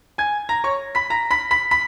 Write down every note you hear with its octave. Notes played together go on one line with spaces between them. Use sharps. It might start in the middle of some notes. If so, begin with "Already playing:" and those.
G#5 G#6
A#5 A#6
C#5 C#6
B5 B6
A#5 A#6
B5 B6
B5 B6
B5 B6